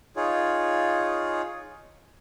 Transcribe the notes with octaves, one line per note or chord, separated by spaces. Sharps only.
D#4 F4 G#4 C#5